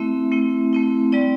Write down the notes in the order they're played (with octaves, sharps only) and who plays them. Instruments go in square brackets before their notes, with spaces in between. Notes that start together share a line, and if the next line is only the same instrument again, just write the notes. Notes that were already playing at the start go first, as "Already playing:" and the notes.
Already playing: [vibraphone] A3 C4 E4 E5
A3 C4 E4
A3 C4 E4
G3 C4 E4 D5